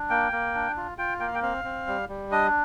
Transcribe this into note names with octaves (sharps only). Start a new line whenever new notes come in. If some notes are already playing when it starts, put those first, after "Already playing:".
Already playing: D4
A#3 G5
A#3
D4
F4
F4 G5
A#3 G5
F5
G5
C4 F5
C4
G3
G3
D4 D#5